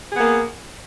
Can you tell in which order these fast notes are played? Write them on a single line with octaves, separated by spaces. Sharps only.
G#4 B3 A#3